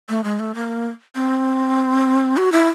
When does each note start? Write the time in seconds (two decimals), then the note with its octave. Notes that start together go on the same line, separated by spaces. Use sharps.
0.09 A3
0.24 G#3
0.39 A3
0.55 A#3
1.15 C4
2.37 F#4
2.52 E4